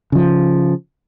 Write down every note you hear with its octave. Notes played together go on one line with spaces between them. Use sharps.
C#3 F3